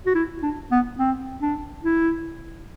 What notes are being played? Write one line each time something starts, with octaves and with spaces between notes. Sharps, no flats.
F#4
E4
D4
B3
C4
D4
E4